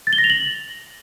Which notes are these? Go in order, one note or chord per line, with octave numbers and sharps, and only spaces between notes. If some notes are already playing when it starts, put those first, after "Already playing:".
A6
G7
A#6
F7
F#7